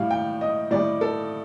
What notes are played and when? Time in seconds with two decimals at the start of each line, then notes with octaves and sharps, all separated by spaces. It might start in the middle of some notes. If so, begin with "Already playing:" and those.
Already playing: A2 G3 F5
0.11 G5
0.41 D#5
0.71 A2 G3 D5
1.01 A4